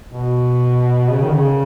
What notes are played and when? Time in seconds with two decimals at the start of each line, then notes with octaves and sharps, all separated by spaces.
0.10 B2
1.10 C#3
1.21 D#3
1.32 C#3